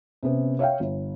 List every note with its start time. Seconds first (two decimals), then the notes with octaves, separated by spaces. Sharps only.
0.23 C3 B3 C#4
0.59 C#5 E5 F5 G5
0.80 G1